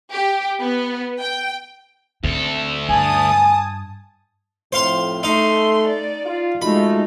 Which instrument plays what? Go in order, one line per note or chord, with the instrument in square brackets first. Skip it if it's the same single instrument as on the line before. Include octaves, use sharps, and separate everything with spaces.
[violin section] G4
B3
G5
[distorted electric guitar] D2 A4 [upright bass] C4
[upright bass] G2 [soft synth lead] G#5 [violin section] A5 D#6
[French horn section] F2 A2 F3 [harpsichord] C5 F5 C6
[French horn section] A3 [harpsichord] D#4 F5 [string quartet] C6
[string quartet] D5
[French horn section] F4
[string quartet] G#3 D#4 [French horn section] A3 F4 F#4 [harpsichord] B5